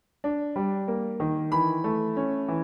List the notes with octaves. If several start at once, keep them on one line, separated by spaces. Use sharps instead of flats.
D4
G3
A#3
D#3
E3 B5
A3
C#4
E3